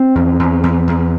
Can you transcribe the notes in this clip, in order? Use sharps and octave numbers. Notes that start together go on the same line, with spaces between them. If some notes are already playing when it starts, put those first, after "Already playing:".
Already playing: C4
E2
E2
E2
E2